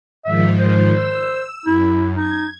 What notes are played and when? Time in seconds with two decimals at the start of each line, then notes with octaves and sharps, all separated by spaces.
0.25 G#2 D#3 F3 E5
0.59 C5
0.91 E6
1.66 F#2 E4
2.17 D#4 G#6